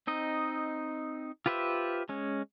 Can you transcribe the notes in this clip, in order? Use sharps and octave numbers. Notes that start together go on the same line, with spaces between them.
C4 D#4 D#5
F4 G4 B4 C5 E5
G#3 C#4